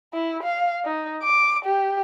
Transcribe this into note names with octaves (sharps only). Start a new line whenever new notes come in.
E4
F5
D#4
D6
G4